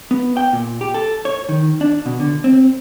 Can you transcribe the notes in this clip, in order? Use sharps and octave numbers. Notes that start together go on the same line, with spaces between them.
B3
G5
A#2
G4
A4
C#5
D#3
D4
B2
D3
C4